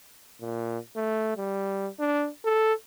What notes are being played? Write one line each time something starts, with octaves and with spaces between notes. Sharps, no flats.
A#2
A3
G3
D4
A4